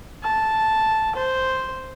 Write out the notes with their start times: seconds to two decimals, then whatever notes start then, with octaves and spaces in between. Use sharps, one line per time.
0.23 A5
1.16 C5